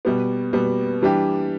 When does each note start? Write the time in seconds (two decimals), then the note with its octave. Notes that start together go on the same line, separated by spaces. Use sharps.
0.05 B2 G3 B3
0.53 B2 G3 B3
1.02 E3 G3 D4 G4